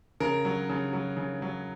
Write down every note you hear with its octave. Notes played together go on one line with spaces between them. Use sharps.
C#3 A#4
F#3
C#3
F#3
C#3
F#3